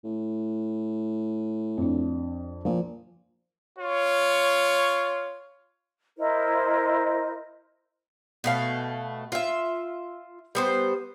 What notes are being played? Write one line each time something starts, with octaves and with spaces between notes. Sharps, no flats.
A2
F2 D4
A#2 F3
F4 C#5
E4 A#4 C5 D#5
B2 A3 F5
F4 E5
G3 B3 C5